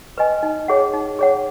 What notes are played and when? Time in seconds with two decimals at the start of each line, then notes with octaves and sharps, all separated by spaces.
0.18 B4 D#5 G#5
0.43 D#4
0.68 G#4 C#5 F#5
0.93 D#4
1.19 G#4 C#5 F#5